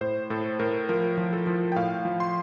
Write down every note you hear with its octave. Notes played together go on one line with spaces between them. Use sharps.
A2 C5
A2 A4
A2 A#4
F3 A#4
F3
A4
F3
G5
A2 F5
F3
C6